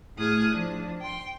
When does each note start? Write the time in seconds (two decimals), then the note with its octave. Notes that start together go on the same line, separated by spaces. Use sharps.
0.18 A2 G#4 D#6 F6 F#6 G#6
0.51 F3 D4
1.00 G5 C6